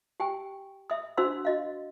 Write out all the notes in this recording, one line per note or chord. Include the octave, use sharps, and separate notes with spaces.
G4 G5 G#5
E5 D#6
D4 F#4 C5 F#5 C6 E6
F#4 D#5 F5